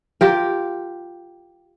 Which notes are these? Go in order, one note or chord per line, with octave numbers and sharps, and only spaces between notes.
F4 G4 A#4